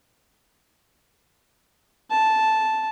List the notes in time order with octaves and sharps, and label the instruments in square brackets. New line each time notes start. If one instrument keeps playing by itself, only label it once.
[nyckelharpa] A5